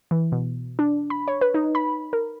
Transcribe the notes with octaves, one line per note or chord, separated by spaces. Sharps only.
E3
B2
D4
B5
C#5
B4
D#4
B5
A#4